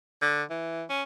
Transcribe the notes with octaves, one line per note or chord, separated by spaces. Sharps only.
D3
E3
C#4